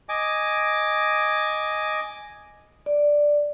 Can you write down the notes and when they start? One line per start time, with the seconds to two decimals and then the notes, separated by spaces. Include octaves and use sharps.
0.09 D#5 G#5 D6
2.86 D5